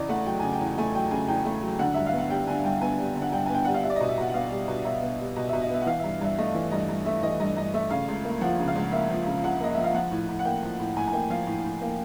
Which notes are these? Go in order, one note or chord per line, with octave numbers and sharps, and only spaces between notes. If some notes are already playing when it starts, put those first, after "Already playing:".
Already playing: E2 C#3 D5 D#5
A3 F#5
F#3 G5
C#3 G#5
G5
E2
A3 G#5
F#3 G5
C#3 G#5
E2 G5
A3
F#3
D3 F#5
G2 E5
F5
B3
F#5
G3 G5
D3 G#5
G2 G5
B3 G#5
G3
D3
F#5
G2 G5
B3 G#5
G5
G3 F#5
F5
G3 E5
D5
B2 D#5
E5
B2 F#5
F#5
B3 F5
G3
B2
B2 E5
B3
G3
B2 D#5
B2 E5
D#5
B3 E5
F#5
E3 F5
G2 E5
G2 E5
A3 D#5
E3
G2 D#5
G2
A3 E5
E3 D#5
G2 D#5
G2 D#5
A3 E5
C#3 F5
C#2
A#3
F3 F#5
C#3
F5
C#2
A#3 E5
F3
C#3
C#2 F#5
A#3 D#5
F3 E5
F5
F3 F#5
A2
A2
F#5
A#3 G5
F3
A2
A2 G#5
G#5
A#3 G5
F3 F5
A2
A2
A#3